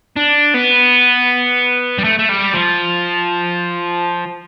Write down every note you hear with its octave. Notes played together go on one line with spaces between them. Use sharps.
D4
B3
G3
A3
A3
G3
F3